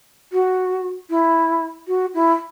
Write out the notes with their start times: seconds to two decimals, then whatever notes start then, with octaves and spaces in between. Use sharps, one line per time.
0.33 F#4
1.10 E4
1.88 F#4
2.14 E4